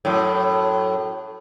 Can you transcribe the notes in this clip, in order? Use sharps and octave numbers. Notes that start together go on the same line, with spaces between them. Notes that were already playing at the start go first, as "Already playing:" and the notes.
F#2 A2